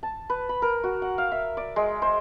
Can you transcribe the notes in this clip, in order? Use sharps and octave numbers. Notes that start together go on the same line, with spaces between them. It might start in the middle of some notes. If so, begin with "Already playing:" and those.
A5
B4
B5
A#4
F#4
F#5
F5
E5
D5
G#3
C5